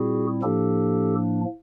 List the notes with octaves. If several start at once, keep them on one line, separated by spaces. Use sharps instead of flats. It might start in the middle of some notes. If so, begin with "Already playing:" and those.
Already playing: A#2 G3 C4 E4 F#4 G#4
A2 F3 A#3 D4 G4 A4